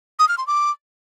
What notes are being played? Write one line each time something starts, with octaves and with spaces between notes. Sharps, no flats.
D#6
F6
C6
D6